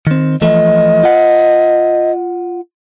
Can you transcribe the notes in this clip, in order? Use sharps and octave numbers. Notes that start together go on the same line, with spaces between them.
D#3 C4
E3 F3 A3 D#5
F4 F#5